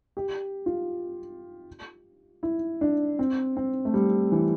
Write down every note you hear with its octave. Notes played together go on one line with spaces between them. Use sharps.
G4
F4
E4
D4
C4
C4
A3
G3
E3